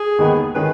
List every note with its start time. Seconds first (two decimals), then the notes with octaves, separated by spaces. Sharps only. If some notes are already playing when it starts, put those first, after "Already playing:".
Already playing: G#4
0.19 D#2 D#3 G#3 B3
0.55 D#3 G#3 C#4 G#4 B4